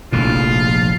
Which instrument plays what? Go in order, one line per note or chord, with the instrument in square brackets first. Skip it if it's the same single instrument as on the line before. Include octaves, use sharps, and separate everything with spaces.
[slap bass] F1 A#1 A2 [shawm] F4